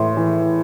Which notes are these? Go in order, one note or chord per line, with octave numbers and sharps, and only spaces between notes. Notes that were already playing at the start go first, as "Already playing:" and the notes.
Already playing: A2 E3 C6
E3